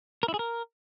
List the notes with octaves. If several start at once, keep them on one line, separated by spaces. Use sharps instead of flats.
A#4
E4
G#4
A#4